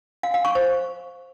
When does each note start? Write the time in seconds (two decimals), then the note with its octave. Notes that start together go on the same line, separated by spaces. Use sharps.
0.23 F5
0.34 F5
0.45 C#6
0.55 C5